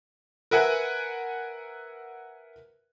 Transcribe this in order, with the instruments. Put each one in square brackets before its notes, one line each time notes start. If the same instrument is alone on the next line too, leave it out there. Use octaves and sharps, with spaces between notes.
[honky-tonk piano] A#4 B4 E5 F#5 G#5